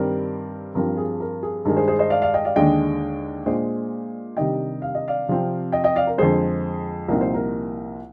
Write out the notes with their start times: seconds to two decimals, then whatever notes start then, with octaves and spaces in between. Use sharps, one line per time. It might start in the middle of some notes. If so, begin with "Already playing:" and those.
Already playing: G2 D#3 G3 C4 A#4 D5
0.75 G2 F3 C4 A#4
0.97 G#4
1.20 A#4
1.43 G#4
1.65 G2 D#3 G#3 A#4
1.77 G#4 C5
1.88 G#4 C5
1.99 C5 D#5
2.10 D5 F5
2.22 D5 F5
2.34 D#5 G5
2.45 D5 F5
2.56 D#2 D3 G#3 D4 D#5 G5
3.46 A#2 G#3 D4 C5 D#5
4.37 C3 D#3 G3 D4 D#5 G5
4.82 F5
4.95 D#5
5.08 D5 F5
5.28 C3 F3 C4
5.72 D#5 G5
5.84 D#5 G5
5.96 D5 F5
6.07 A#4
6.18 F2 D3 G#3 G#4 C5
7.08 C2 A#2 F3 C4 D#4 A#4
7.21 C5
7.34 A#4